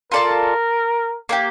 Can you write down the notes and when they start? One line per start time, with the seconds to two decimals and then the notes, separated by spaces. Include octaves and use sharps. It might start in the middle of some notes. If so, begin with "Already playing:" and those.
0.12 F4 A4 A#4 D5 A5
1.29 A#3 D4 G4